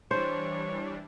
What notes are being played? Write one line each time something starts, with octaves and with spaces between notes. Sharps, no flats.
E3 G3 D4 C5 C#5